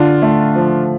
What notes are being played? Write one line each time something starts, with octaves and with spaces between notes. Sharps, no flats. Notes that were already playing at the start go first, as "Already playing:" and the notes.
Already playing: D3 D4 F4
A3
F3